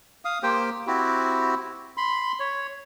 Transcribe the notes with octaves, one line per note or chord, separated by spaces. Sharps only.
F5 D#6
A#3 G4 C5 G5
C4 E4 F#4 G4
B5 C6
C#5